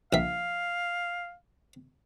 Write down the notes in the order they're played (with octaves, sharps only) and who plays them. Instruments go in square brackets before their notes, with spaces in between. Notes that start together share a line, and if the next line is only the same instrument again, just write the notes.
[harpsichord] A#1 E5 [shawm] F5